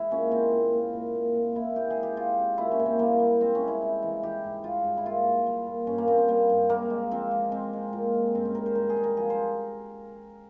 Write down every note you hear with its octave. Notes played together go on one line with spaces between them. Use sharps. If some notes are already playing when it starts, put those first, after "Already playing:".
Already playing: G#3 E4
A#2 C#4
A#2 C4
A#2
A#2
A#2
A#2
A#2
A#2 E4
C3 G4
G#4
G#3
G4
C3 F4
C3
A#2 E4
C#4
A#2
C4
G3 A#3
G3
G#3 C4
C#4
C3
E4
C3
E3
E3 G4
G#2
G3 F4
G#2
E4
A#2 F4
G3
G3
A#2
G2 C#4
A#3
G3 C4
C4
G3 A#3
G2
G#3 A#3
G#3
F3 C4
G#3
G#3 C4
G#3
A#2
G#3
G2 C4
C#4
G3 A#4
C5
G2 A#4
G#4
G3
A#4
F3 G#4
C5